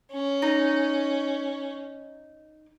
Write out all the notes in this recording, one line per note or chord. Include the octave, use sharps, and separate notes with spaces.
C#4
D#4